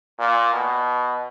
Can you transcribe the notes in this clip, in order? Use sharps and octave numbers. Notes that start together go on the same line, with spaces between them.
A#2
B2